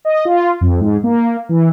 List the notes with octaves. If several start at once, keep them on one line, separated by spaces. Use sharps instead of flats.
D#5
F4
F2
G#2
A#3
E3